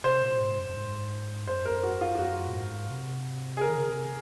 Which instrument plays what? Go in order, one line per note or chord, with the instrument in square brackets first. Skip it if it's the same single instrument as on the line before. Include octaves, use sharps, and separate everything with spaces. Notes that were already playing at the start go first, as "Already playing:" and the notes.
[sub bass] C3 [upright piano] C5
[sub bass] A#2
G#2
F#2
F#2
G#2
[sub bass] F#2 [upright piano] C5
[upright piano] A#4
[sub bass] F#2
[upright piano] F#4
F4
F4
[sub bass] F#2 [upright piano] F#4
[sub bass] A#2
G#2
C3
[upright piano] G#4
[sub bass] C#3 [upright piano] A#4
[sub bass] D#3
C#3
C3